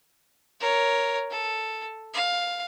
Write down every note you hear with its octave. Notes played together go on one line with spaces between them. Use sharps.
A#4 C#5
A4
F5